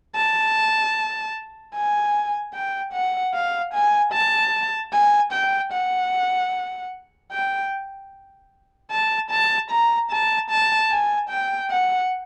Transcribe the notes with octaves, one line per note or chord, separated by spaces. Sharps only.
A5
G#5
G5
F#5
F5
G#5
A5
G#5
G5
F#5
G5
A5
A5
A#5
A5
A5
G#5
G5
F#5